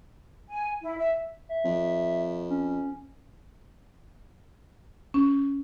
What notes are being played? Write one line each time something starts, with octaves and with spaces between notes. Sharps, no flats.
G#5
E4
E5
E5
F2
C#4
C#4